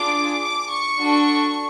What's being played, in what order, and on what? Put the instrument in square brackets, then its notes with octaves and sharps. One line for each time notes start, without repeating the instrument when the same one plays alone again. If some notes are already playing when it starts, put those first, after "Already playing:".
Already playing: [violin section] D4 F4 G#4 D6
D6
C#6
D4 F#4 A4